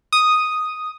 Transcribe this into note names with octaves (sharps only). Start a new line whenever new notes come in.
D#6